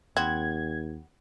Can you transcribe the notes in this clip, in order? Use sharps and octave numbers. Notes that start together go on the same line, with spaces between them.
D#2 G3 C4 F#5 G#6